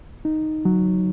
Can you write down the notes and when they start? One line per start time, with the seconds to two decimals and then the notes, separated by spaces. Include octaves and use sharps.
0.25 D#4
0.65 F#3